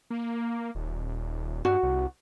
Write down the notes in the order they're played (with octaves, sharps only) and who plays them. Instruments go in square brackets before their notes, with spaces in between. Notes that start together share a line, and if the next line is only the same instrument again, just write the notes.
[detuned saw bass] A#3
D#1
[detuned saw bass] G2 [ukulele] F#4
[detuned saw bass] C2